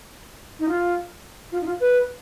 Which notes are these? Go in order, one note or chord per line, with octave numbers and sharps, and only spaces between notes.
D#4
F4
F4
D#4
F4
B4